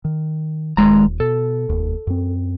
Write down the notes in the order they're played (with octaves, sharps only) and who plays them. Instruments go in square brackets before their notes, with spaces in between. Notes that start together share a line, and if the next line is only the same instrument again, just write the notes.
[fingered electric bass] D#3
[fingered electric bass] D#1 [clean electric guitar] D#2 G#3 A#5
[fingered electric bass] B2 [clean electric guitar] A4
[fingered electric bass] F1 D#2
F#2 C4